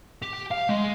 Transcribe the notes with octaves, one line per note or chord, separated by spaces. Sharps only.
G4
F5
G#3